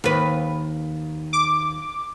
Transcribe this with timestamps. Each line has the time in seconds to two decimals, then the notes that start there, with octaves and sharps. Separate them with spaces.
0.04 D#2 B4
1.33 D6